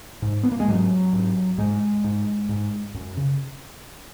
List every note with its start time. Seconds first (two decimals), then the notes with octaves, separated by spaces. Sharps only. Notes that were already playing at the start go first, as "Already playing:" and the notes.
0.22 G#2
0.43 B3
0.52 A#3
0.60 G#3
0.68 G#2 F#3
1.13 G#2
1.58 G#2 G#3
2.04 G#2
2.49 G#2
2.95 F#2
3.17 C#3